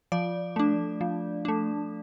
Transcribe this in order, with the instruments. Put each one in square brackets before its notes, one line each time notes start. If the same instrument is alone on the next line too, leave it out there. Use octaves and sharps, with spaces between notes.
[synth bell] F3 D5
A3 D4
F3
A3 D4